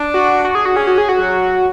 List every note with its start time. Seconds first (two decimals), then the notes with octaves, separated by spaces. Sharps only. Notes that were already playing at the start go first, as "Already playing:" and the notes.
Already playing: D4
0.14 F#4
0.45 F#4
0.55 G#4
0.65 F#4
0.74 C#4 G#4
0.87 F#4
0.98 G#4
1.09 F#4
1.19 F#3